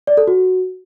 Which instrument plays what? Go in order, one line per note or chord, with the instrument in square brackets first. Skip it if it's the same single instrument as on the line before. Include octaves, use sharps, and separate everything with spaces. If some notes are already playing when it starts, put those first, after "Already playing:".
[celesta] D5
A4
F#4